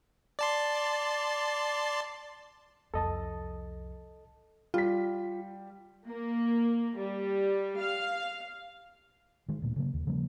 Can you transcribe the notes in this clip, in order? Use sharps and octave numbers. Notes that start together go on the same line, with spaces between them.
D5 A5 C6
C2 F2 A4 D#5 A5
G3 F4 B6
A#3
G3
F5
D#3 G#3
D2 A#2
C#3 F#3 A#3
D#2
C#3 F3 G3 A#3